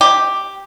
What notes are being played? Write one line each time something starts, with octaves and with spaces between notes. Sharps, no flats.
G4